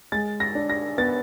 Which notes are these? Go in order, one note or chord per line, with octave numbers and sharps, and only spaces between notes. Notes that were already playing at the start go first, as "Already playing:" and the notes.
G#3 A6
A#6
D4
A#6
B3 A6